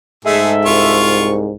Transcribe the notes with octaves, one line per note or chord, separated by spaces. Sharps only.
G#2 G#3 A3 G#4 A4 E5
C2 F4 C#6